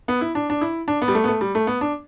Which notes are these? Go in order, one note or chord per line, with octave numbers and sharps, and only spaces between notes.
B3
E4
D4
D4
E4
D4
B3
G3
A3
B3
A3
G3
A3
B3
D4